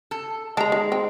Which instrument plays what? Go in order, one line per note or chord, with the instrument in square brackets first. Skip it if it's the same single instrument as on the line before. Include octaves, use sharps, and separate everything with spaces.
[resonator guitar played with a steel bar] A4
[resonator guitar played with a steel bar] G#3 [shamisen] A5 A#5
[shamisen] D#3
C4